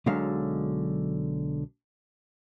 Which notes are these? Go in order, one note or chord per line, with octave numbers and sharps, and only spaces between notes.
B1 D3 F#3 G#3 F5